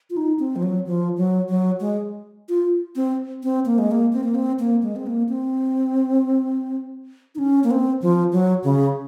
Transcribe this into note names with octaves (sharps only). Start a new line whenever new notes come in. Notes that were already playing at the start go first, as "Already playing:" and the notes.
F4
D#4
C4
F3
F#3
F3
F#3
F#3
G#3
F4
C4
C4
A#3
G#3
A#3
C4
A#3
C4
A#3
G#3
C4
A#3
C4
D#4
C#4
A#3
C4
F3
F#3
C#3